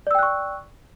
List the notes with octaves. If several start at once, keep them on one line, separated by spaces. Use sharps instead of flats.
D5 G5 C#6 E6 F#6